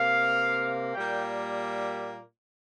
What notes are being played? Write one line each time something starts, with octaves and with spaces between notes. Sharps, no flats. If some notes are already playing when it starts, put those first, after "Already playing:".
Already playing: C3 A#3 F5
A#2 G3 A#3 G5